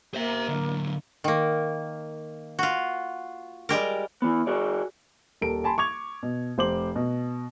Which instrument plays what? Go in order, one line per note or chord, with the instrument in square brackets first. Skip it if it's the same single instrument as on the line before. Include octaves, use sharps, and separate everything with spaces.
[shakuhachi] A#3 [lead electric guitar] C5 E5
[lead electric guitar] D3 F#3
[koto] D#3 A#3
F4 F#4
G3 G#3 G4 A#4
[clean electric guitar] E3 B3
F#4 G#4 D5
[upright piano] D#1 A4 A#4 D7
G#5 A5 B5 C6
C#6 D6 G#6 F7
B2
F1 C5 D6 F#7
B2